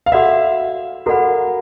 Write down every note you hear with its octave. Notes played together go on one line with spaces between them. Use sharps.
F5
F#4 A4 D5 E5 F#5 B5
F#4 A4 A#4 D5 F#5 B5